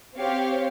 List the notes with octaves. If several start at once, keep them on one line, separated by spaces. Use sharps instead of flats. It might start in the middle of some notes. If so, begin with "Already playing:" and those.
C4 G4 C#5 F5